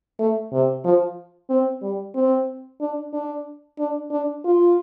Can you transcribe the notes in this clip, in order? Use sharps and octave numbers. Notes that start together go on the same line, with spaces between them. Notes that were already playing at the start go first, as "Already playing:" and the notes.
A3
C3
F3
C4
G3
C4
D4
D4
D4
D4
F4